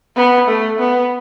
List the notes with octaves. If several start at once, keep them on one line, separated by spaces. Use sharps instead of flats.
B3
A3
B3